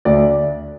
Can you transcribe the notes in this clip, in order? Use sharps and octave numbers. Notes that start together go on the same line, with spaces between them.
D2 D5